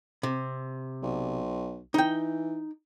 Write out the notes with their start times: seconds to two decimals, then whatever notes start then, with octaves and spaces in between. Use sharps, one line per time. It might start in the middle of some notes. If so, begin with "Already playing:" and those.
0.23 C3
1.03 B1
1.94 E3 D#4 G5